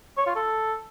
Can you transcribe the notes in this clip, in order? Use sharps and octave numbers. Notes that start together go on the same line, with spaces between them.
C#5
F4
A4